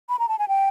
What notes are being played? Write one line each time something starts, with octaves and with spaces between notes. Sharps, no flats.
B5
A#5
A5
G#5
G5